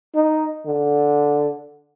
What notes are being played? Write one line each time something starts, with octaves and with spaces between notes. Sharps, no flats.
D#4
D3